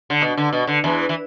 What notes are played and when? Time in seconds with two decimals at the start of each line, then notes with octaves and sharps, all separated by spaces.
0.10 D3
0.22 B2
0.37 D3
0.53 B2
0.67 D3
0.84 E2 E3
1.09 E3